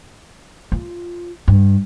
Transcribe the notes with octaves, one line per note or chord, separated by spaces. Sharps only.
F4
G2